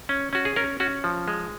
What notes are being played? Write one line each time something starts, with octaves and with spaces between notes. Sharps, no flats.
C#4
C#4 F#4
G#4
C#4 A#4
C#4 F#4
F3
G#3